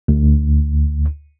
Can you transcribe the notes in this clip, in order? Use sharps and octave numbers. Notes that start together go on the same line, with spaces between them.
D2